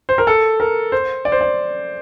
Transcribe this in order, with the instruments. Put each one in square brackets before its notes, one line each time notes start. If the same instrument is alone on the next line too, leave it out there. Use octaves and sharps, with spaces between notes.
[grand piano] C5
A#4
A4
A#4
C5
D5
C5
D5